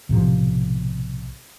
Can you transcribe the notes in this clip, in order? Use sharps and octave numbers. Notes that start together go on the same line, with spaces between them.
B1 A2 C3 F3